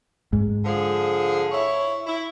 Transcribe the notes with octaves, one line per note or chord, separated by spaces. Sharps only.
G#2
D3 F3 G#4
E4 C#5
E4